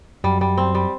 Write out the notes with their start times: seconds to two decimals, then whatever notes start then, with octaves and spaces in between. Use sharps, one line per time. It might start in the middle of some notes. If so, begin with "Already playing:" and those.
0.24 F#2 G3
0.41 G3
0.58 C4
0.75 G3